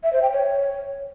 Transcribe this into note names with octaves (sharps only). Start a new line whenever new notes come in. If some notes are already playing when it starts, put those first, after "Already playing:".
E5
C5
G5
C#5